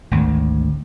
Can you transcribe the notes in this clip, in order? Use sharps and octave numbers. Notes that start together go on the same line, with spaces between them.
G#1 D2